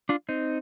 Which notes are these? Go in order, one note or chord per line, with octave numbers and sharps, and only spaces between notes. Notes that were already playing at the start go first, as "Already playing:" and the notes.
D4 F4
C4 D#4